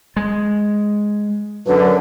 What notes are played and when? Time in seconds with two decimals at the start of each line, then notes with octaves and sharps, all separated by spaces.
0.16 G#3
1.66 F#2 D3 B4